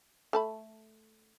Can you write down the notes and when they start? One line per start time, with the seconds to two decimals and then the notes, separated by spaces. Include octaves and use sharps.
0.33 A3 A5 B5